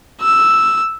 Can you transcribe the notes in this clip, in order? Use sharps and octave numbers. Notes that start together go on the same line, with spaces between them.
E6